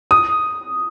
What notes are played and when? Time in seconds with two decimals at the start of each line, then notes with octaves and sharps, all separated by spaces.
0.11 D#6